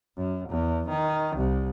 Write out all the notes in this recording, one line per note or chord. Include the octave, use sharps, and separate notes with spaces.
F#2
E2
D#3
C2